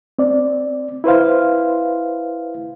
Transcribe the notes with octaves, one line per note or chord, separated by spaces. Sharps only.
C4 D5
E4 B4 C5 F5